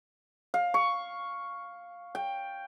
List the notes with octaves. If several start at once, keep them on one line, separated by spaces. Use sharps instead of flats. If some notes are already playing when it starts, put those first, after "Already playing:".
F5
C#6
G5